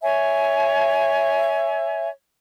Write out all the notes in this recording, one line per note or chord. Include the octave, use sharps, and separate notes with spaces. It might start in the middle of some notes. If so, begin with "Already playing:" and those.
C#5 E5 G#5